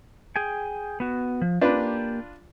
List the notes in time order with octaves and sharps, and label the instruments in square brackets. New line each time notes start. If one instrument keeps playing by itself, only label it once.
[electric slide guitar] G#4 G5 G#5
B3 F#4
F3
[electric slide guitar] A#3 G4 [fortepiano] D4 F4 B4